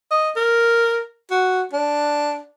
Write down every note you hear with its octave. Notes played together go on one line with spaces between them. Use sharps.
D#5
A#4
F#4
D4